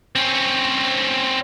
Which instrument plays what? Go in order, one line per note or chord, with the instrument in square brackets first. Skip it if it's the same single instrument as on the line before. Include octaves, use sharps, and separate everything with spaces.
[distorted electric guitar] C4 C#4